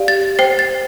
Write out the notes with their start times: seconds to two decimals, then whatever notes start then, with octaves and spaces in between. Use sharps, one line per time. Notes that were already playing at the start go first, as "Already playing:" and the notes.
Already playing: G4 D5 F5
0.08 A6
0.39 C5 G5 C7
0.59 A6